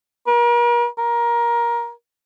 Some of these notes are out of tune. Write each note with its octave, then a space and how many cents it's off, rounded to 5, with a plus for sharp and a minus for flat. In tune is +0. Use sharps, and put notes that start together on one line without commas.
A#4 +40
A#4 +20